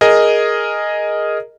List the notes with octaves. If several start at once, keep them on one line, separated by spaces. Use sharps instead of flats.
G#4 A#4 D#5